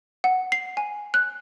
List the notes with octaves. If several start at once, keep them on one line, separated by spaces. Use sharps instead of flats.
F#5
C7
G#5
F#6